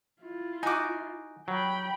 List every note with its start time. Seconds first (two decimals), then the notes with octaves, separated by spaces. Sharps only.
0.23 E4 F4
0.63 D#4 F#4 G#5 D6
1.48 F#3 G5 B5